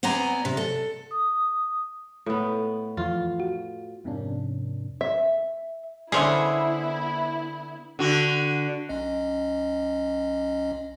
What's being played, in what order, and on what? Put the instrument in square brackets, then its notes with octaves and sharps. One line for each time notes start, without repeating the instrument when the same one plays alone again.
[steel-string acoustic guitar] B3 C4 D5 D#5 G#5 A#5
C3
A4
[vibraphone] D#6
[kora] A2 B3
[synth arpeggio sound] F2 E3 F3 [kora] F4
[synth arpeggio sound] F#4
[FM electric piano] F2 G#2 C3 A#3 C#4 D4
[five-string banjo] E5
[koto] D3 G#4 [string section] B3 E4 [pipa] C#4 C5 E5
[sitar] D3 F#4
[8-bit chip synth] B1 C#4 D#5